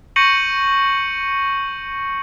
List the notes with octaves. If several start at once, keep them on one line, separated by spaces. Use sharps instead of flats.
C#6 G6 A#6 C#7 D#7 F#7